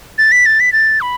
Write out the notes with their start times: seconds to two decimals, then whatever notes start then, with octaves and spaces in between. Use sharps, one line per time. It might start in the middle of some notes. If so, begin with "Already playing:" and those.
0.18 A6
0.32 B6
0.46 A6
0.60 B6
0.73 A6
1.01 B5